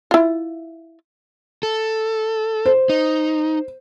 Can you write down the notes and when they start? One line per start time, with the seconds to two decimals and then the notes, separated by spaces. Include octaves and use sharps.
0.11 E4 F4
1.63 A4
2.66 C5
2.89 D#4